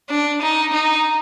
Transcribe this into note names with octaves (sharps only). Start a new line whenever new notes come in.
D4
D#4
D#4